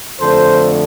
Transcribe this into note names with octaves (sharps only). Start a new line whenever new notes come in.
F2 D3 A3 A4 C5